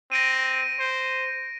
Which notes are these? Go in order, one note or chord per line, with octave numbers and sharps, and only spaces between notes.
C4 A#6 D7 D#7
C5